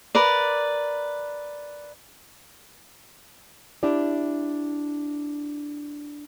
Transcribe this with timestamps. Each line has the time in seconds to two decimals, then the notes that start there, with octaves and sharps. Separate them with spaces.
0.15 A#4 B4 D5
3.83 D4 E4 G4 D5